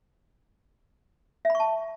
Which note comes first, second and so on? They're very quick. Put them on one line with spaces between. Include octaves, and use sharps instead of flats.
E5 B5 C#6 A5